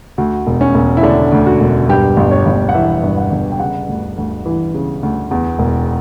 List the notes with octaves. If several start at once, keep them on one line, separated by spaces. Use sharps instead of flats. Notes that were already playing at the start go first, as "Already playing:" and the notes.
D2 F#4
E1
C#4
E1
E4
D3 D4
D2
F#4
E1
G2 G4
G1
C#5
G1
F#5
E3 E5
G2
F#5
G1
G5
C#3 F#5
D2
D2
E3
C#3
D2
E2
E1